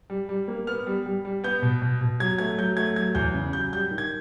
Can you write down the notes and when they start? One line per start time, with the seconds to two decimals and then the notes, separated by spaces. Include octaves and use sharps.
0.10 G3
0.29 G3
0.48 A#3
0.67 B3 F6
0.87 G3
1.06 G3
1.25 G3
1.44 B3 G6
1.62 B2
1.82 B2
2.01 B2
2.20 F#3 G#6
2.38 A3 G#6
2.58 F#3 G6
2.77 A3 G#6
2.96 F#3 G#6
3.15 E2 G6
3.34 C#3
3.53 F#3 G6
3.73 G3 G6
3.91 D#3
3.98 G#6